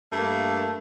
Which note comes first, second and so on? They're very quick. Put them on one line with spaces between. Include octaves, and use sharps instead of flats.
A3 G2 A#3